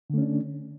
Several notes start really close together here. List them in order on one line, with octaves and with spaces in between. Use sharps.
D3 A3 C#4 D4